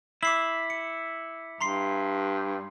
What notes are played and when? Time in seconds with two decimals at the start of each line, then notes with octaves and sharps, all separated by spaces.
0.23 E4 D6 C7 F#7
0.70 C#7
1.61 G2 A#5 C6 C7